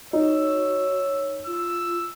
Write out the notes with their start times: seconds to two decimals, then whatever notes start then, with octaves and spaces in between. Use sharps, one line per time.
0.13 D#4 F#4 C#5 E6
1.46 F4 E6